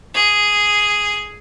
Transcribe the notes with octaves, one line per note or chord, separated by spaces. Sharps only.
G#4